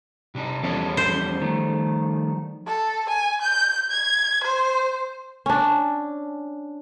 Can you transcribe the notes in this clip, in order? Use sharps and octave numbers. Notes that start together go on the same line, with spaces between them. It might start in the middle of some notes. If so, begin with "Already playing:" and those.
C3 D4 D#4
E2 F3 G3 C#4 A4
C5
D#3 A3
A4
G#5
G6
G#6
C5
C#4 D4